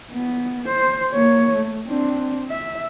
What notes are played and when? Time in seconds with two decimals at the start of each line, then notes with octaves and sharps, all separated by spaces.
0.12 B3
0.68 C5
1.12 A#3 C#5
1.55 A3
1.88 C4 D4
2.49 E5